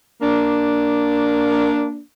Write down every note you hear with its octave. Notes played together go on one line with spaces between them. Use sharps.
A#3 D4